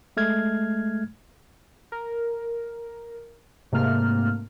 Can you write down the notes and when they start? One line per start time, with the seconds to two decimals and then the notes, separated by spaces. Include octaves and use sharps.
0.17 G#3 A3 F6 G#6
1.92 A#4
3.72 G#2 C3 A3 A#3 F6